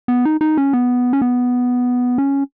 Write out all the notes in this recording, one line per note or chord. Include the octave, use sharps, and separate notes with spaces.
B3
D#4
D#4
C#4
B3
C#4
B3
C#4